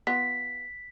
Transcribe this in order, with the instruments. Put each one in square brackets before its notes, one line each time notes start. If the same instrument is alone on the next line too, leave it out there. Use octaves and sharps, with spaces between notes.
[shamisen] B3 F4 [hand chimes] B6